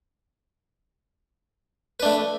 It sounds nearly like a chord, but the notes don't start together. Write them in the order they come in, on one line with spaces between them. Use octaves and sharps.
B4 D4 A3